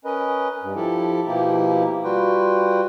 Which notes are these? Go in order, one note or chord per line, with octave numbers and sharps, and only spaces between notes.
C#4 A#4 B4 D#5
G2
F3 E4 G4 A4
B2 F3 A#3 D#4 E4 G4
G3 F4 F#4 B4 G5